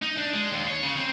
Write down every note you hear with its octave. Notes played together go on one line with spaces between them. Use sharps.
D#4
D4
G#3
D#2
C#5
C#3
C4